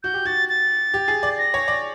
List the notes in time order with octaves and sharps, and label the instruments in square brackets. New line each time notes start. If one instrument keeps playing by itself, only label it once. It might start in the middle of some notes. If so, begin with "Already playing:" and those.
[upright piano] F#4 [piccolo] G6
[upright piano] G4
[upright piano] F#4 [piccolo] A6
[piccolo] A6
[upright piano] G4
G#4
D5
[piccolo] A#6
[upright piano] C#5
D5